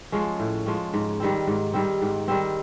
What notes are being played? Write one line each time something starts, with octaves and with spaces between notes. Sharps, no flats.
F3 G#3 C#4
A2
F3 G#3 C#4
G#2
D#3 G3 C4
G#2
D#3 G3 C4
G#2
D#3 G3 C4